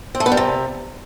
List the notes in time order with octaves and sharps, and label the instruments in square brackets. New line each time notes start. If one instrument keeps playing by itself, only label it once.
[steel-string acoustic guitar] C4
A3
B3
G3
C3